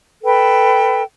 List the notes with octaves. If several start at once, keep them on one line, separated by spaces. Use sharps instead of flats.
A4 B4 G5